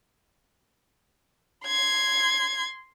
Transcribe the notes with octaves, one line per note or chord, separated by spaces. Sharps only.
C6 G#6